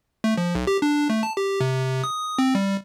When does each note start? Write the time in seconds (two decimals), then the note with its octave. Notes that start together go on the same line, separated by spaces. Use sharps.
0.24 A3
0.38 F3
0.55 B1
0.67 G4
0.82 D4
1.10 A3
1.23 A5
1.37 G4
1.60 C3
2.04 D#6
2.38 C4
2.55 G3